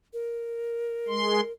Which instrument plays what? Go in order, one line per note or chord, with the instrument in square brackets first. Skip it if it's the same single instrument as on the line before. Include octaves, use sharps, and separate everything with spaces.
[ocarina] A#4
[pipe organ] G#3 C6